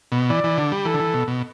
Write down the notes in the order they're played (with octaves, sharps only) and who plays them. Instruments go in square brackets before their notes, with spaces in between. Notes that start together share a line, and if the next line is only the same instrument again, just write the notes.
[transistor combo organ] B2
[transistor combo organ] E3 [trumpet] D5
[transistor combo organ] E3
D3
G3
[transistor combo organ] E3 [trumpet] A4
[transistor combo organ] D3
E3
B2
B2